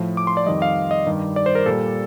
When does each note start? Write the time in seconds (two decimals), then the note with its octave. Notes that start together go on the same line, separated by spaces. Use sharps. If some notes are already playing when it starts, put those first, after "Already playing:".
Already playing: A2 F3
0.17 D6
0.27 C6
0.37 D5
0.46 F2 D#3 G3 D#5
0.62 F5
0.91 D#5
1.06 G2 D#3 G3
1.36 D5
1.46 C5
1.55 A#4
1.66 A#2 G3 A4